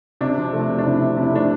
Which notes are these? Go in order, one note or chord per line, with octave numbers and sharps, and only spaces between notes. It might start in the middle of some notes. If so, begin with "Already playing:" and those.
C3 D4
F3
A3
C3
D4
C3 E4
C3
C3 E4
A3 D4